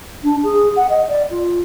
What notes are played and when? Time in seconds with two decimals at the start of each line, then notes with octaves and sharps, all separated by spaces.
0.23 D4
0.43 G#4
0.76 F#5
0.90 D#5
1.08 D5
1.31 F4